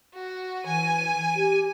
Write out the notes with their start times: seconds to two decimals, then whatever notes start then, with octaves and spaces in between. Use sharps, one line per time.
0.14 F#4
0.65 E3 G#5 D#7
1.36 G4